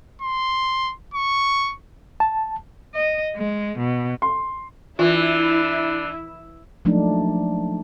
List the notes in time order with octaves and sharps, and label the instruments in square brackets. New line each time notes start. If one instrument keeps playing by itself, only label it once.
[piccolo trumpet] C6
C#6
[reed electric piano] A5
[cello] D#5
G#3
B2
[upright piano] C6
[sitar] E3 [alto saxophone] D4 [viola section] E4 [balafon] F4
[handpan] F3 F#3 A3 A#3 D4 D#4